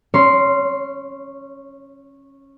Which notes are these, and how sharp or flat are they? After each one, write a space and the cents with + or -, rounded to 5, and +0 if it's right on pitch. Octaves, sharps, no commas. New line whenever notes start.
C#4 -15 C#5 +25 C6 +0